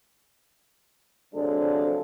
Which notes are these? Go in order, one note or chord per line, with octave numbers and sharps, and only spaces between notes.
C3 F3 F#3 G#3 D4 A4